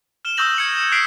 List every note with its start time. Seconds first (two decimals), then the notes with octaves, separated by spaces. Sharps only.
0.25 F6 E7 G7
0.37 C#6 D#6 E6 G6 A#6 F#7
0.56 G#6 C#7 F#7
0.74 E7
0.92 D#6 F#6 B6 C7 D7 F#7